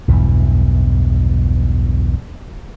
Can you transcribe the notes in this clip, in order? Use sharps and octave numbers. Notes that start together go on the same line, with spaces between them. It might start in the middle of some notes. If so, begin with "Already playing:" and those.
B1 E2 G2 E3